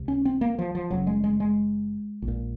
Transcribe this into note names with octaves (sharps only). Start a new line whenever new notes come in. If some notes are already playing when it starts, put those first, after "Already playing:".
Already playing: C#2 C3
C#4
C4
A#3
F3
F3
F#1 F#2 C#3 F#3
G#3
G#3
G#3
A#1
A#2